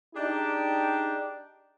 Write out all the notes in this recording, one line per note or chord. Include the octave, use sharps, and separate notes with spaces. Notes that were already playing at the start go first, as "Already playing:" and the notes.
D4 D#4 G4 G#4 G5